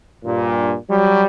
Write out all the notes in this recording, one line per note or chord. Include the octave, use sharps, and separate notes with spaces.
G2 A#2
F#3 G3